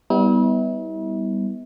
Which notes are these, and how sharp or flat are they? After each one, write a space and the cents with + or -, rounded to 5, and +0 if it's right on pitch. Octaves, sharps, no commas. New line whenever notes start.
G3 +0 B3 +5 E4 -40